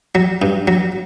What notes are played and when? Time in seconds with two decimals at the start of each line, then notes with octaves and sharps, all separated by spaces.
0.15 F#3
0.42 G2
0.68 F#3